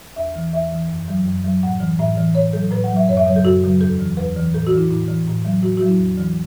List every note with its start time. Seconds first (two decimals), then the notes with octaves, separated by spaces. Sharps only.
0.16 E2 E5
0.35 E3
0.53 E2 E5
0.72 E3
0.90 F#2
1.08 F#3
1.26 F#2
1.44 F#3
1.63 A2 F#5
1.80 E3
1.99 A2 E5
2.17 E3
2.35 A2 C#5
2.53 F#3 A4
2.71 A2 B4
2.84 F#5
2.90 F#3
2.96 E5
3.09 F#2 C#5
3.17 E5
3.26 C#3 F#3 C#5
3.36 A4
3.44 F#2 F#4
3.63 C#3 F#3
3.81 E2 A4
3.99 E3
4.17 E2 B4
4.36 E3
4.53 A2 A4
4.67 F#4
4.73 E3 E4
4.91 A2 E4
5.08 E3
5.27 A2
5.45 F#3
5.63 A2 F#4
5.77 F#3 F#4
5.88 E4
5.99 E2
6.17 E3